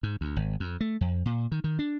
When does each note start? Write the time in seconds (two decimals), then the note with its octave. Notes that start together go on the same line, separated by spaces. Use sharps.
0.03 G#2
0.21 D2
0.36 G#1
0.60 F2
0.81 A3
1.01 F2
1.26 A#2
1.52 D#3
1.64 D#3
1.79 D4